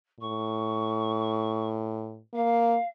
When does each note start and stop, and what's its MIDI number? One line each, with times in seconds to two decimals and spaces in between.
0.20 2.21 45
0.20 1.67 85
2.34 2.77 58
2.34 2.87 77